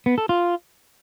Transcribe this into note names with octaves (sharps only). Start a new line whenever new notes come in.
B3
A4
F4